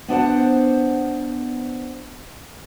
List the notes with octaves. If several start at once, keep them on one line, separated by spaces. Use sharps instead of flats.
B3 D4 C5 F#5